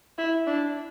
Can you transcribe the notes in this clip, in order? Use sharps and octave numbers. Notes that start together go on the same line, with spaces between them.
E4
D4